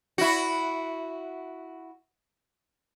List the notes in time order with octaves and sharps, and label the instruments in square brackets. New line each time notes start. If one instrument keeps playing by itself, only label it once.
[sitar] E4 F#4